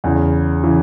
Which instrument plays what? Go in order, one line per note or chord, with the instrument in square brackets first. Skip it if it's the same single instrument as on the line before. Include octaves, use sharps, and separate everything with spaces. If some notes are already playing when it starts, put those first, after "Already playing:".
[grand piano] E2 C#3 E3
C#3 E3